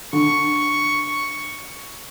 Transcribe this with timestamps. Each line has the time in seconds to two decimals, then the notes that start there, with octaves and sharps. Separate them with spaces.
0.13 D3 C#6